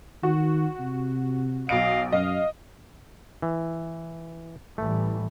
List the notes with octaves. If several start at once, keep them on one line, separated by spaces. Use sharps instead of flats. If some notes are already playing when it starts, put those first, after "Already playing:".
D#3 F#4
C3
B1 D#5 F5 D#6 D7
F#2 D#5 F5
E3
A1 E3 G3 A3